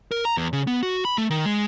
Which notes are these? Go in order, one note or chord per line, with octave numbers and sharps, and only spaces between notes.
A#4
A#5
E2
C#3
B3
F#4
B5
A3
D#3
G#3